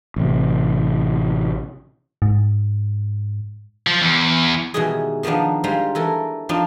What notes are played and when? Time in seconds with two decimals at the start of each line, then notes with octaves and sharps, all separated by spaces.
0.16 A1 C3
2.22 G#2
3.87 F3
4.02 E2
4.74 B2 D#3 E3 G3 G#3 G#4
5.23 D#3 F3 A#3 B3 D4
5.64 G3 G#3 F4 A#4 C5 F5
5.95 E3 A4 A#4
6.49 F3 C4 D4 D#4 F4